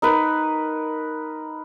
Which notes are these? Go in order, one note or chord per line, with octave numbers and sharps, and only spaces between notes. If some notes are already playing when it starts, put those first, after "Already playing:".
D#4 A#4 B4